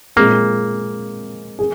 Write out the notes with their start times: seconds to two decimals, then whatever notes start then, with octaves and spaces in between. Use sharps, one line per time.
0.16 A#2 G#3 A#3 C4 G#4
1.59 G#4